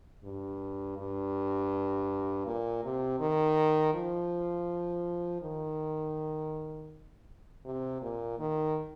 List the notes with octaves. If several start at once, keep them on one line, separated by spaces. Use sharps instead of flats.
G2
G2
A#2
C3
D#3
F3
D#3
C3
A#2
D#3